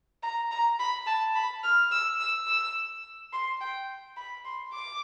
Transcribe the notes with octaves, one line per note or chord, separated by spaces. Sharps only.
A#5
A#5
B5
A5
B5
F6
E6
E6
E6
C6
G5
B5
C6
D6